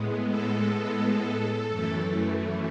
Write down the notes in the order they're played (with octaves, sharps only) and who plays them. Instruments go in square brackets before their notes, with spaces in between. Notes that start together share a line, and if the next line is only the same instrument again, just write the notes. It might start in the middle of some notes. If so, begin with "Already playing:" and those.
Already playing: [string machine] A2 G#3 B3
A4
F#2 E3 A3